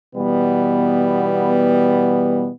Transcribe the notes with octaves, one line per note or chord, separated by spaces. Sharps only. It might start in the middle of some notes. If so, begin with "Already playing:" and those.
B2 E3 G3 B3